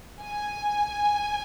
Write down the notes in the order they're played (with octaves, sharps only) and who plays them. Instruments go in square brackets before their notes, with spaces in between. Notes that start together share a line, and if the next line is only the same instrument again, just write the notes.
[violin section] G#5